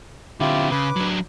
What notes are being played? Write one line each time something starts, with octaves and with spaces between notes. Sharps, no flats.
D3 C4 E4 F4 G4
C#3 B4 D6
F#3 D4